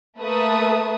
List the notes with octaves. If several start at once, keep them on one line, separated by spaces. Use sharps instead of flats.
A3 A#3 B4 E5 A5 D#6